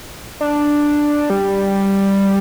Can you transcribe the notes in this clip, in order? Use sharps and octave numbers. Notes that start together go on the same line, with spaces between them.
D4
G3